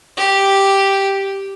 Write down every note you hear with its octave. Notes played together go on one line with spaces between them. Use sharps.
G4